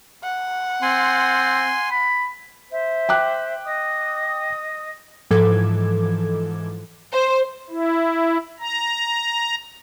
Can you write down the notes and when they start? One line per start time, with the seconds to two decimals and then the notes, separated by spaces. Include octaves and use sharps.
0.23 F#5
0.82 C4 G#5 C6
1.91 B5
2.71 C5 E5
3.09 G5 D6 F#6
3.65 D#5 D#6
5.31 G#2 E3 F3 A4 D6 G#6
7.12 C5
7.70 E4
8.60 A#5